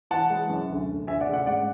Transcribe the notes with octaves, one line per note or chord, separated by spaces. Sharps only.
E3 F#5 A5
G#3
F#2
D2
D2
D2 E5 G#5
D5 F#5
C#3
D5 F#5
G#2 D5 F#5